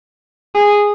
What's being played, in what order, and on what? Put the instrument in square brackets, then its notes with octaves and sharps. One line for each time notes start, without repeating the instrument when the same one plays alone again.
[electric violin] G#4